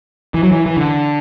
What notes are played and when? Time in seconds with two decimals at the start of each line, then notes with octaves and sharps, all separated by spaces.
0.34 E3
0.43 F#3
0.52 E3
0.66 E3
0.77 D3